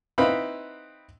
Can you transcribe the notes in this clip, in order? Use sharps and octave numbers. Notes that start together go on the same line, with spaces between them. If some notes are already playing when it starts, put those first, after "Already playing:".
C4 D#4 E4 B4 F5 B5